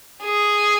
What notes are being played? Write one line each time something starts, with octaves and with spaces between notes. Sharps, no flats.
G#4